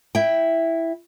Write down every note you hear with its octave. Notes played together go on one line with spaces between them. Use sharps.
E4 G5